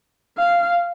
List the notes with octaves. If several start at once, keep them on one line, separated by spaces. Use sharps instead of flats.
F5